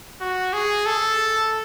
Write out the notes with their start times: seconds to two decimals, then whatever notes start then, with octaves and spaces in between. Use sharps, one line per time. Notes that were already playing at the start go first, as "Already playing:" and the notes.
0.21 F#4
0.54 G#4
0.86 A4